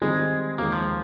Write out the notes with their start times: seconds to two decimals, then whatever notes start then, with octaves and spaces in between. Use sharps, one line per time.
0.02 D#3 G3 G#3 C4 D#4 G#4
0.58 D#2 D#3 G#3 A#3
0.72 F3